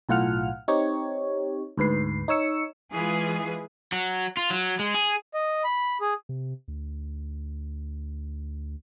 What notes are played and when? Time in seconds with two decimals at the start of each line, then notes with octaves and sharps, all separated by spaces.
0.09 B1 A2 F4 F#5 F6
0.68 C4 D#4 G4 C#5
1.77 D2 G#2 B4 C7
2.28 D#4 C#5 E6 C#7
2.91 E3 G#3 F4 G#4 B4
3.92 F#3
4.37 F4
4.50 F#3
4.79 G#3
4.94 G#4
5.34 D#5
5.64 B5
6.01 G#4
6.29 C3
6.68 D2